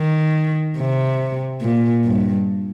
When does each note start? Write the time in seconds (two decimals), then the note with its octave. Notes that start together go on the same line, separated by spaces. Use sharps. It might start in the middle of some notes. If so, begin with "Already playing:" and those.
Already playing: D#3
0.78 C3
1.62 A#2
2.04 G2